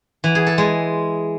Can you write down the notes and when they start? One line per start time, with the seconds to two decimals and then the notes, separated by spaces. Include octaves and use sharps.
0.24 E3
0.35 G#4
0.46 A4
0.58 G#3